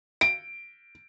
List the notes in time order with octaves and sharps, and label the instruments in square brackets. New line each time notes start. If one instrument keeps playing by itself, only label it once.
[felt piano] D7